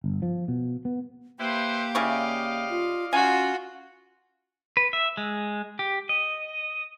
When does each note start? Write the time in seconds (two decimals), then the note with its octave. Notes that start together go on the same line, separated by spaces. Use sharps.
0.04 G1
0.22 F3
0.48 B2
0.85 B3
1.39 A#3 E4 G4 B4 C5
1.95 C#3 E4 D5 D#5 F5 C#6
2.70 F4
3.13 C#4 F4 F#4 G#5
4.77 B4
4.93 E5
5.17 G#3
5.79 G4
6.09 D#5